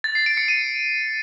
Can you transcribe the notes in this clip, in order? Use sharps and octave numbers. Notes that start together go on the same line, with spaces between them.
A6
C7
D7
C#7
D#7